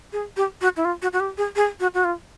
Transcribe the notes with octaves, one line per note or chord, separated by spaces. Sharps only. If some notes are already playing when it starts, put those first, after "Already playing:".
G#4
G4
F#4
E4
F4
F#4
F#4
G4
G#4
G#4
F#4
F#4
F4